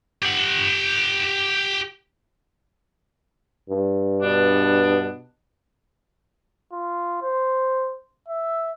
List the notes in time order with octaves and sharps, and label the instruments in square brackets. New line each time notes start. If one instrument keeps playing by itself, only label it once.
[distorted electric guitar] G4 F#5
[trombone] G2
[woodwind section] B2 B3 D4
[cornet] F4
C5
E5